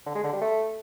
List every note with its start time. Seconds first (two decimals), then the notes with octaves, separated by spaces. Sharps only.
0.06 D3
0.15 G#3
0.24 D3
0.32 G3
0.41 A3